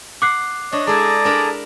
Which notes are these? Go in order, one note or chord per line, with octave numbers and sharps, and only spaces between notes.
F#5 D6 F#6 C7
D4 C#5 D#5
G#3 E4 G#4 A4 D5 A#5
D4 A#4 B5